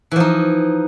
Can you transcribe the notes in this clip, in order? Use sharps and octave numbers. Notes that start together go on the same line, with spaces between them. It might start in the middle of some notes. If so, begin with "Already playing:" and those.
E3 F3 D#4